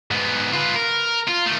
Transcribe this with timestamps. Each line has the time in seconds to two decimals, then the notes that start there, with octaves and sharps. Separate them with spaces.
0.11 G#2 B3
0.53 F4 B4
0.76 A#4
1.27 F4
1.46 D#3 A3